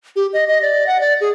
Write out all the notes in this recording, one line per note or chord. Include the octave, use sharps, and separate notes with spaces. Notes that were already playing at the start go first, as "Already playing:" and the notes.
G4
D#5
D#5
D5
F#5
D5
G#4